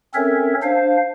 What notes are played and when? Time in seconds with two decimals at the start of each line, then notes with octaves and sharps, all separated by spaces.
0.14 C4 C#4 A4 A#4 C#5 E5
0.63 D4 C5 F5